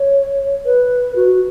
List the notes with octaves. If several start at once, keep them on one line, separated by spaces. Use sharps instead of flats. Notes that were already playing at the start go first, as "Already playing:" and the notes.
Already playing: C#5
B4
F#4